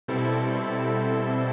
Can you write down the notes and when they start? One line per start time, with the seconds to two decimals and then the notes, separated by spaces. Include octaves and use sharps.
0.08 B2 G3 C4 E4 A4